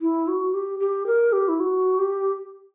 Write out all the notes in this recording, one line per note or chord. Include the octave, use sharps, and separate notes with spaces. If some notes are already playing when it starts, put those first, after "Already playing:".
E4
F#4
G4
G4
A#4
G4
E4
F#4
G4